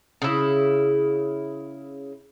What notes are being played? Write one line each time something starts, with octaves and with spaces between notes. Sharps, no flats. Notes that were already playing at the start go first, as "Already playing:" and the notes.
C#3 E4